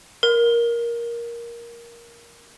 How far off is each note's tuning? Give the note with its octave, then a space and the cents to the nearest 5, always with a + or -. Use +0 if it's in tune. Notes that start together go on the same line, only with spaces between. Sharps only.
A#4 +10